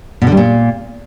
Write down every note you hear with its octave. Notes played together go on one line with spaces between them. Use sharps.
B2
D3
G3
A#2